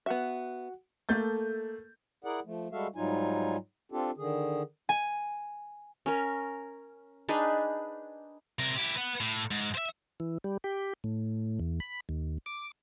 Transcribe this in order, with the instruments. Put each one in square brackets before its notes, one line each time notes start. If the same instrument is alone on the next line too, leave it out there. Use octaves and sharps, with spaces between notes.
[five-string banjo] B3 E5 [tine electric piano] F#4 F#5
[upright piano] A3 A#3 A4 G6 A6
[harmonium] E4 G#4 A#4 D5 F#5
F3 A3
G3 G#3 F#4 A4 E5 F5
G#2 F#3 G3 D#4 F4 G#5
C4 D4 F4 G4 A4
D3 D#3 G#4
[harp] G#5
[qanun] C#4 A#4
D4 D#4 G#4 B4
[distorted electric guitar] C3 A#4
E4 G4
B4 F#5
A2
G#2
C5 E5
[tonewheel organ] E3
G3
G4
A2
E2
B5
D#2
D6